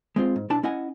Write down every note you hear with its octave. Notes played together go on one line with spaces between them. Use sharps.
G#3 C4 F4
G#2
B1 D4 E4 A5
C#4 E4 D#5 F#5 G#5